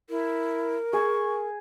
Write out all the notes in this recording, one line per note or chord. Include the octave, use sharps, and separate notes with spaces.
E4 A#4
G#4 C#6